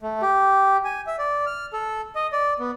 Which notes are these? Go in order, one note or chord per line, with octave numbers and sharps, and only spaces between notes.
A3
G4
G#5
E5
D5
F6
A4
D#5
D5
B3